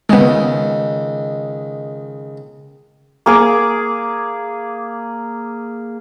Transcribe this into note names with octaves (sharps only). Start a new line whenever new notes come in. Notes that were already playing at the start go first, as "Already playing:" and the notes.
C#2 D#3 G#3 B3
A#3 G#4 D6